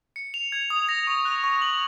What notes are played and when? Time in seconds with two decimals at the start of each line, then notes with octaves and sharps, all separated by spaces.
0.16 C#7
0.34 F7
0.52 G#6
0.70 D#6
0.89 A#6
1.07 C#6
1.25 F#6
1.44 C#6
1.62 F#7